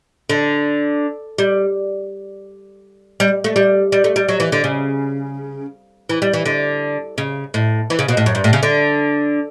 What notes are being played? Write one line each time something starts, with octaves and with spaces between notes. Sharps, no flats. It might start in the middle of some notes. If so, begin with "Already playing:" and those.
D3
G3
G3
A3
G3
G3
A3
G3
F#3
E3
D3
C#3
E3
G3
E3
D3
C#3
A2
E3
C#3
B2
A2
F#2
G2
A2
C#3
D3